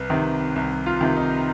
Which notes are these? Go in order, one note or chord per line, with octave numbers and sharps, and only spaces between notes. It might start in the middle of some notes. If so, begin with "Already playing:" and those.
Already playing: C2 B4
C3 D#3
C2
F4
C3 D#3
D#4